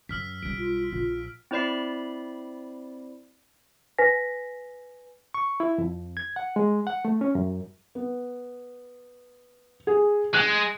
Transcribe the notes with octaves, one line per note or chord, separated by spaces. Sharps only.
F#2 E6 F6 B6
B1 G3 D7
F4
A#1 F4
C4 E4 C5 D5 B5 C7
B4 G#5 A#6 B6
C#6
E4
F2
G#6
F#5
G#3
F#5
A3
C#4
F#2
B3
G#4
G#3 F#6